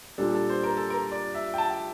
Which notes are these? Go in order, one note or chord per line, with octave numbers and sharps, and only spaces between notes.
A#2 G3 D4 A4
A4
C5
A#4
A4
A#4
D5
E5
G5
A5
G5